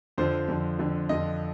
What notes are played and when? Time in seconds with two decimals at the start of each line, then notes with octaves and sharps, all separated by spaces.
0.18 F2 D3 F3 C5
0.48 F2 D3 F3
0.79 F2 D3 F3
1.09 F2 D3 F3 D#5